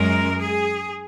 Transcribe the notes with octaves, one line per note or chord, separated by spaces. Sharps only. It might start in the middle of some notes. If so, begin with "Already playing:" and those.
Already playing: F#2 G#3 A#4
G#4